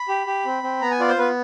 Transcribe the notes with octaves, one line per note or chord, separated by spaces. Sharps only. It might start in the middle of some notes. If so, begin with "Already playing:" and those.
Already playing: B5
G4
G4
C4
C4
B3 A#5
G#5
F4 D5
C5
B3 B4